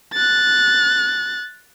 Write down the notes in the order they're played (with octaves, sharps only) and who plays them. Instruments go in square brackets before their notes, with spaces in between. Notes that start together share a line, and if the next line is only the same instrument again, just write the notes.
[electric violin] F#6 A6